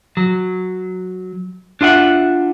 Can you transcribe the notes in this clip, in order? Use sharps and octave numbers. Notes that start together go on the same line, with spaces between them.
F#3
D4 F4 E5 F#5